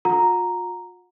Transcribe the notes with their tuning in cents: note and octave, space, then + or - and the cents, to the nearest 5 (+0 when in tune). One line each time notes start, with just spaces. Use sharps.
F4 +40 F#5 -25 A#5 +0